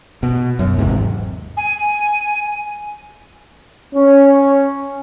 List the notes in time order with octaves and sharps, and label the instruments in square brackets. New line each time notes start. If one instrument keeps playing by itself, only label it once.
[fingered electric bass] B2
F#2
G#1 E2 G#2 C3
[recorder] G#5
[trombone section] C#4